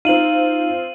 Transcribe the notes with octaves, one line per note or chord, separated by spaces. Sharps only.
C4 D#4 F4 D#7 F#7